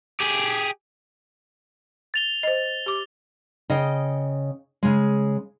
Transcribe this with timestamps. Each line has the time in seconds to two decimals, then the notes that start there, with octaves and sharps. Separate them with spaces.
0.20 G4 G#4
2.14 A6 F7 G7
2.43 C5 D#5
2.86 G4 D6
3.70 C#3 D#5 G5
4.83 C#3 G#3